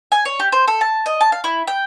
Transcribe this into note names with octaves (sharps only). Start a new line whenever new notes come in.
G#5
C#5
G4
C5
A4
A5
D#5
A5
F5
E4
G5